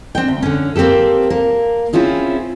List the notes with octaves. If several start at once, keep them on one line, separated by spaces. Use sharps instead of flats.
C4 D4 G5
D2
D3 C#4
A#3 C4 C#4 G4 A4
A#3
C4 C#4 E4 F4 G#4